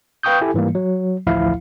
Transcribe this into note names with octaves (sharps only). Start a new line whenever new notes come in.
B4 F5 G5 C#6 D#6 G6
E4 G4 A4 G#5
G#2 E3 G3 A#3
F#3
A1 D2 F3 E4 F5